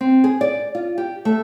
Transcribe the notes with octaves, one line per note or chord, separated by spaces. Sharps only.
C4
G#4
D5
F4
G4
A3